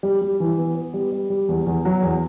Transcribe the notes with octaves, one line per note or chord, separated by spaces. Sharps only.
G3
G3
E3
B3
B3
G3
G3
G3
E2
E2
F#3
E2